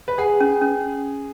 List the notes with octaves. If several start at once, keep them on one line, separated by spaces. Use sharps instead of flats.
B4
G#4 F#5
C#4
C#4